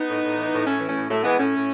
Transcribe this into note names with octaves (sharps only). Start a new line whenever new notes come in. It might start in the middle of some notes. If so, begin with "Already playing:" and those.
Already playing: B3 D#4
A2
A2
E3
A2
A2 A3 C#4
E3
A3 C#4
A2
A2 F#3 A3
E3 G#3 B3
A2 A3 C#4
A2